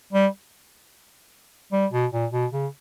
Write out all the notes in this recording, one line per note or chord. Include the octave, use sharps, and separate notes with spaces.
G3
G3
B2
A#2
B2
C#3